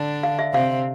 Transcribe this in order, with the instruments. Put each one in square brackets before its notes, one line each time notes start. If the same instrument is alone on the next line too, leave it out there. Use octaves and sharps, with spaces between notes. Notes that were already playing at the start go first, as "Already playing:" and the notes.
Already playing: [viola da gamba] D3 D4
[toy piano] F5
E5
[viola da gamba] C3 C4 [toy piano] F5